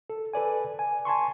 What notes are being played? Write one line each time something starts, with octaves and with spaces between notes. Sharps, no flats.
A4
A4 B4 D5 G#5
G#5
G#5 A5 C6 C#6